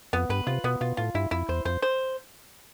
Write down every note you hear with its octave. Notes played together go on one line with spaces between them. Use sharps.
F2 B3
G2 B4
C3 F4
B2 B3
B2 F4
A2 F4
G2 E4
F2 E4
E2 C5
F2 C5
C5